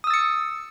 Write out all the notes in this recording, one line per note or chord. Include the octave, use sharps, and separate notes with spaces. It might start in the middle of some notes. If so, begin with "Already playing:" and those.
D#6 E6 A6 C#7